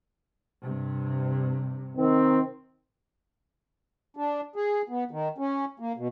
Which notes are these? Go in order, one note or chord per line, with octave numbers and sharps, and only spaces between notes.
G2 C3
D#3 C4
D4
G#4
B3
D#3
C#4
A#3
B2